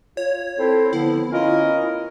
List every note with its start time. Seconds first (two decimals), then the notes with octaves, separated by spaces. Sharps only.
0.17 F4 C#5
0.58 C4 E4 A4 C5
0.93 D3 F3 B3 E4
1.32 C#4 F4 A#4 D#5
1.64 F4